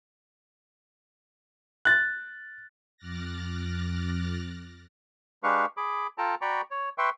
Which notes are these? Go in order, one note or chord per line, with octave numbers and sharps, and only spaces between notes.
F#6 A6
F2 D6 F6 F#6 A6 A#6
G#3 D4 G4 B4 F5 C#6
G#4 B5 D6
F4 A4 G5 A5 A#5
F#4 D5 G5 A#5 B5 C#6
C#5
B4 E5 G5 C6 C#6